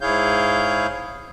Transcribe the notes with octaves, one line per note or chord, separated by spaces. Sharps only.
G#2 E4 G#4 C#5 F5 G6